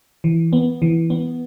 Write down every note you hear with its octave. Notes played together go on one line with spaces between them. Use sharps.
E3
B3
E3
B3